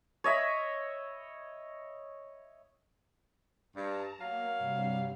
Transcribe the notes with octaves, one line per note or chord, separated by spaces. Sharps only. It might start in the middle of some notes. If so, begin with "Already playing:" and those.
C#5 D#5 E5 B5
G2 A5 A#5
F#3 A#3 F5
G2 C3 G3